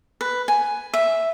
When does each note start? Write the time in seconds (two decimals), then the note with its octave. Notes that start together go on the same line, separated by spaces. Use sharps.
0.21 B4
0.48 G#5
0.94 E5